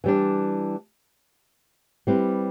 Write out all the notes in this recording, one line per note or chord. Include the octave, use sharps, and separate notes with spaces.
E3 G3 D4
G3 C4 E4 B4